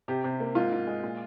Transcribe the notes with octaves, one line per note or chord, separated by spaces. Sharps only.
C3 G4
C3
A#3
G#2 F4
G#2
G#3
A#2